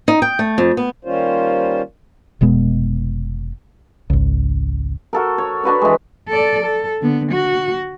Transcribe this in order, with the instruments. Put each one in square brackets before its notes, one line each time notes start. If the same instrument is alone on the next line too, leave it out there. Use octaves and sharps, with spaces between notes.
[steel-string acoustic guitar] D#4
G5
A3
F2
B3
[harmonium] D#3 G3 A#3 C#4 F4 C5
[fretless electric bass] F1 B2 G#3 B3
G#1 C#2
[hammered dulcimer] F#4 A4 A#4
C#5
D4 F#4 B4 C#5
E3 G#3
[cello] A4 D5
A4
D3 B3
F#4